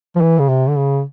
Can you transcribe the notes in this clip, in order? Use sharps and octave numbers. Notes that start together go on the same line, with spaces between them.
F3
E3
C#3
C3
D3
C#3